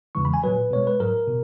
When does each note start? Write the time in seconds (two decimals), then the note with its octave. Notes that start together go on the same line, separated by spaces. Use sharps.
0.15 E2 C#3 E3 G#3 C#6
0.25 B5
0.34 G#5
0.43 A#2 F#3 B4
0.71 B2 G#3 C#5
0.87 B4
1.00 G#2 F#3 A#4
1.28 B2